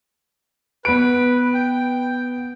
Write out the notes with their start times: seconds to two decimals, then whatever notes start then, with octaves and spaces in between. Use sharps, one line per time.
0.85 B3 B4 D7
1.54 G5